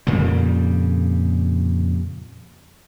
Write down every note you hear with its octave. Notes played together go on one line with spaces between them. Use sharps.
F2 A#2 C#3 G3